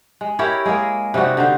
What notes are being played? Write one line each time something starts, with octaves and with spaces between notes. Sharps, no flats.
G#3
E4 G4 A#4 C#5
G#3 A#3 G#4 A#4
C3 G3 D#4 F#4
D3 D#4 C5